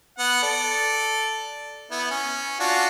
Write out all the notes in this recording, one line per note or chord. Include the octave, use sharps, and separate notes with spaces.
B3 F#5
A4 D5
B3 E4
C#4
D4 F4 F#4